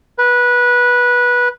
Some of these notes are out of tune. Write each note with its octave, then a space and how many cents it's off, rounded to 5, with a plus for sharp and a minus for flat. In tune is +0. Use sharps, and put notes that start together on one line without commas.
B4 -15